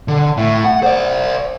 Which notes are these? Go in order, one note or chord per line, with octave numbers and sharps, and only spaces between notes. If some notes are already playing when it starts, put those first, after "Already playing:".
D3
A2
F#5
C5 D5